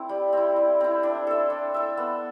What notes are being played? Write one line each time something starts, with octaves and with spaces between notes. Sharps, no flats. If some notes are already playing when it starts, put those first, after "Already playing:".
Already playing: A3 C4 E4
G3
C4 E4
G3
C4 E4
D4
A4 E5
D4
A4 E5
B3